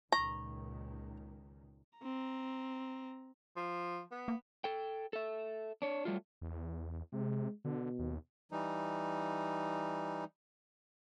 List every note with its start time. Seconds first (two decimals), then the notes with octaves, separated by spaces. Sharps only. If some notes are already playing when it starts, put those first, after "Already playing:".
0.12 C#2 A#2 D#3 A#5 C#6
1.99 C4 A#5
3.56 F3
4.12 B3
4.28 A#3
4.64 A4 G5
5.13 A4 E5
5.82 D4 C#5
6.05 F#3 G3 A3 F4
6.41 E2
7.12 C3 G#3
7.65 B2 D3
7.99 D#2
8.51 E3 G3 D#4